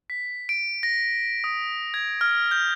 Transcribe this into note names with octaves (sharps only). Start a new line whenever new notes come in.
B6
D7
A#6
D#6
G#6
F6
G6